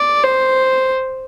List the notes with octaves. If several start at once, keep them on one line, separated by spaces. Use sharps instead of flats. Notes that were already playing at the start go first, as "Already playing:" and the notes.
Already playing: D5
C5